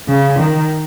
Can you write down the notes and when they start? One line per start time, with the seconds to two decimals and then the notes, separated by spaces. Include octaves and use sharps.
0.08 C#3
0.39 D#3